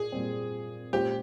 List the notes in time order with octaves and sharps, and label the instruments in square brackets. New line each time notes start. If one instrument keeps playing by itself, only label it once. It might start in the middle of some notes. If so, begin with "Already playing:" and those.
Already playing: [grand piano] A#2 [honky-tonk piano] G#4
[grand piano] A#2 G3 C4
[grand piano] A#2 G#3 C#4 F4 C5 [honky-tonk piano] G4